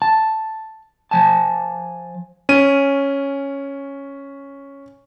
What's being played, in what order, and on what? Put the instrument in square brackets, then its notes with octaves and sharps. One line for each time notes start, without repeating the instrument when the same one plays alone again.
[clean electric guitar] A5
F3 G#5 A5
[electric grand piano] C#4 D#7